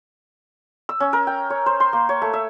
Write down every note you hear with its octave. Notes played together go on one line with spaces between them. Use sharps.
E6
C#4
A#4
G5
C#5
C5
C6
A#3
C#5
A3
E5